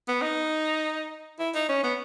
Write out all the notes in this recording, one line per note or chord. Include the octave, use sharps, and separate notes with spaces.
B3
D#4
E4
D#4
C#4
B3